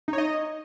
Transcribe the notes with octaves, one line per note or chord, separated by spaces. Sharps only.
D#4
C#5
D#5